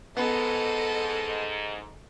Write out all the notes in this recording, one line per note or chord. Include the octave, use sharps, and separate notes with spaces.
G#2 B3 A4 D#5